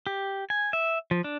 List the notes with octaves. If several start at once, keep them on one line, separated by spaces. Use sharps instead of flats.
G4
G#5
E5
F3
D4